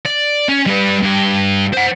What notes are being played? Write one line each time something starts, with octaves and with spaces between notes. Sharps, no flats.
D5
C#4
G3 B4
G2 G4
C5 F#5